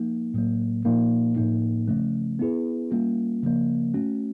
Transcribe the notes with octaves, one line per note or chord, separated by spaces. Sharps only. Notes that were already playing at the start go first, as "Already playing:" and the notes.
Already playing: F3 A#3 D#4
A2 F#3 A#3
A#2 F3 A#3 D#4
A2 F3 A#3 D#4
C#3 F3 A3 C#4
B3 E4 G#4 B4
G3 A#3 C#4 F4
C#3 F3 A#3
A3 C#4 F#4